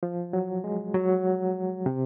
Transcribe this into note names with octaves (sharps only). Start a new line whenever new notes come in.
F3
F#3
G#3
F#3
C3